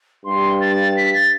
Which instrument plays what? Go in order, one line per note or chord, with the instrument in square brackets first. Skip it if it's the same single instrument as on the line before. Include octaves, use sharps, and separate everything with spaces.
[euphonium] G2 [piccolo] C6
[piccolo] A6
B6
A6